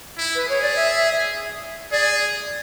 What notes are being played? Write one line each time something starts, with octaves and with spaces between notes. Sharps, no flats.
E4
B4
G#4 C#5
D5
E5
G#4 D5